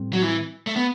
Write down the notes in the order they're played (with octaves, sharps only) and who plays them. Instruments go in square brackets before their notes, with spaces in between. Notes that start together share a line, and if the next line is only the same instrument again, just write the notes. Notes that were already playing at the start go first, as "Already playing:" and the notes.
Already playing: [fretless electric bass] A2 G3 C4
[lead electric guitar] F#3
E3
A3
B3